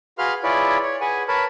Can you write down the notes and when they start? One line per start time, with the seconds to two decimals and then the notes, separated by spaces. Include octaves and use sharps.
0.18 F#4 G#4 B4 F5 C6 F6
0.43 E4 F4 G#4 B4 C#5 D5
0.83 C#5
1.01 G#4 B4 F#5 G#5
1.28 A#4 B4 C#5 A5 B5